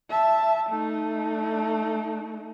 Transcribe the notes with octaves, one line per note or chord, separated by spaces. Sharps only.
E5 A5
A3 D#4